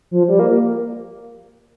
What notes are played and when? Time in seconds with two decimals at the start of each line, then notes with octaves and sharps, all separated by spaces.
0.11 F3
0.29 G3
0.39 A#3
0.51 A#3